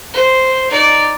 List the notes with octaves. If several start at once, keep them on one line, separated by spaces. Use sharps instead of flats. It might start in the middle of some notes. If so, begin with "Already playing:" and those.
C5
D#4 D5